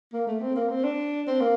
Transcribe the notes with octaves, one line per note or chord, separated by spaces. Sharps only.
A#3
A3
C4
A#3
C4
D4
C4
A#3